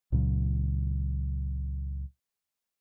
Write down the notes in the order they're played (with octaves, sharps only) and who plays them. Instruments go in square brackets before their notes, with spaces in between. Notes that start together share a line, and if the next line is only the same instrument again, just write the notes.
[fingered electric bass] C#2 A#2 C#3 F#3